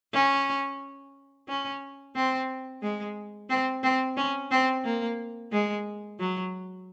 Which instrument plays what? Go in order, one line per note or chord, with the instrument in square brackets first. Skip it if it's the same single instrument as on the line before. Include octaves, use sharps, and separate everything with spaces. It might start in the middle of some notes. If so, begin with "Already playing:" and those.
[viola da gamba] C#4
C#4
C4
G#3
C4
C4
C#4
C4
A#3
G#3
F#3